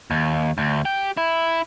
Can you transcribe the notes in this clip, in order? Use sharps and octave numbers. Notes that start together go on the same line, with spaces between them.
D#2
D2
G4
E4